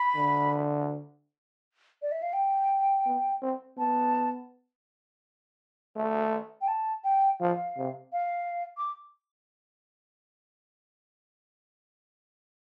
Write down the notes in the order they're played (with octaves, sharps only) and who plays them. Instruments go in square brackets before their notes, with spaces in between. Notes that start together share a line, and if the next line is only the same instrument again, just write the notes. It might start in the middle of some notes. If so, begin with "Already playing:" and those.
Already playing: [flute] B5
[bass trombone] D3
[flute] D5
E5
F5
G5
[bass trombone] B3
C4
[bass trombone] B3 [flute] A5
[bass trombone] A3
[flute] G5
A5
G5
[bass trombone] F3 [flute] F5
[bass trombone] C3
[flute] F5
D6